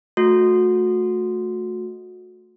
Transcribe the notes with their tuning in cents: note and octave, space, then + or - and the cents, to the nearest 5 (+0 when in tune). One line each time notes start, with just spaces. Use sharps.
A3 -5 F#4 -30